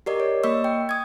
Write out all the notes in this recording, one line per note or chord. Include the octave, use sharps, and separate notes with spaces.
G4 A#4 D5 D#5
C#5
A#3 D#5 C#6 E6
G5
D#6 G#6